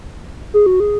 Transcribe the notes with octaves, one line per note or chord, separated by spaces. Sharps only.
G#4
F#4
G#4